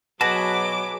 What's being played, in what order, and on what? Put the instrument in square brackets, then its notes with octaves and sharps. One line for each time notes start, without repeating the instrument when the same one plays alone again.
[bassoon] B2 [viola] F#3 D6 [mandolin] F#4 [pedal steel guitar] G#4 B4 A5